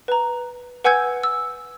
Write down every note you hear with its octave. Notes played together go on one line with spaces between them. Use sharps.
B4 A#5
B4 F#5 G#5 E6 G6 G#6
E6